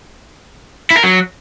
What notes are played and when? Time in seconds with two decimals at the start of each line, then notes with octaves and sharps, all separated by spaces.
0.90 E4
0.97 A#4
1.04 F#3